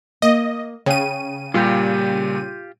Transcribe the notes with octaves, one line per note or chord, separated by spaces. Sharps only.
A#3 D#5
C#3 C#5 G5 D#7
A#2 G3 F4 G4